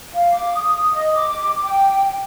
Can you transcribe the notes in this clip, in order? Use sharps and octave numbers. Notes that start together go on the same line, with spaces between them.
F5
D6
D#6
D#5
D6
G5